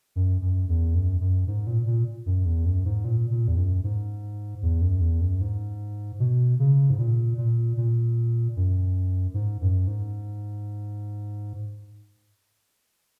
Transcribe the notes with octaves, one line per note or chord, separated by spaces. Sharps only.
F#2
F#2
E2
F#2
F#2
G#2
A#2
A#2
F#2
E2
F#2
G#2
A#2
A#2
E2
F#2
G#2
E2
F#2
E2
F#2
G#2
B2
C#3
G#2
A#2
A#2
A#2
F#2
G#2
F#2
G#2